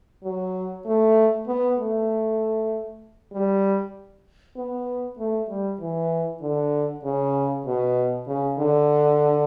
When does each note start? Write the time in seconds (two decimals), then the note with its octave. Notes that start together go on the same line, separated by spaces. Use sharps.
0.24 F#3
0.85 A3
1.47 B3
1.78 A3
3.33 G3
4.57 B3
5.18 A3
5.49 G3
5.80 E3
6.41 D3
7.04 C#3
7.66 B2
8.27 C#3
8.58 D3